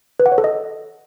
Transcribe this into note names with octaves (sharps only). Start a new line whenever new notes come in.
B4
F#5
C#5
A4
D#5